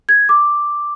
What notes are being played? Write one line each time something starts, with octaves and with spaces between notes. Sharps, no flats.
G#6
D6